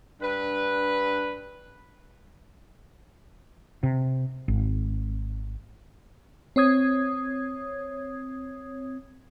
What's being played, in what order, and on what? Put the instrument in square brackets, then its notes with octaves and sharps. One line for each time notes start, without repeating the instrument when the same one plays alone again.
[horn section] G2 D4 B4
[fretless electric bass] C3
G#1
[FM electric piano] C4 C#5 D#6 G#6